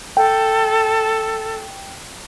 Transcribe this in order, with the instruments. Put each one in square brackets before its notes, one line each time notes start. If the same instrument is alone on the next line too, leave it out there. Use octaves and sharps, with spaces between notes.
[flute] A4 [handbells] G5